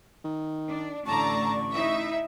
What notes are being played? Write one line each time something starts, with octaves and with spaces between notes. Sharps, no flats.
D#3
D4
A1 A2 D3 D5 A5 A#5 C#6
D#4 E4 E5